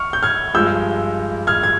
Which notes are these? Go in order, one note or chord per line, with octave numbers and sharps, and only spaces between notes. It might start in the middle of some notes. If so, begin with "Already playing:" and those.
Already playing: C#6 F6
G6
F6 G#6
G2 F3 G#3 E6 G6
F6 G#6
G#6